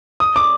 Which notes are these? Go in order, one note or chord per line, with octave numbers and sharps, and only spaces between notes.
D#6
D6